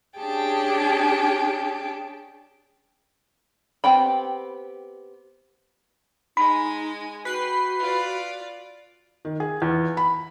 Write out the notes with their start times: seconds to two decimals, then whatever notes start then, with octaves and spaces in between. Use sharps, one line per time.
0.16 C#4 D4 G4 G#4 G5 A5
3.84 B3 C4 G4 G5 B5
6.37 G#3 D#4 G#5 B5
7.25 F#4 B4 G5 C7
7.79 F4 D5
9.25 D#3
9.40 G#4
9.62 E2
9.97 B5